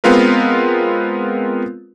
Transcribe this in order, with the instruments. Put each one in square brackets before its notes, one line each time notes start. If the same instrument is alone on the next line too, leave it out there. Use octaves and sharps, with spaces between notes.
[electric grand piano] G#3 B3 C4 F4 A#4 B4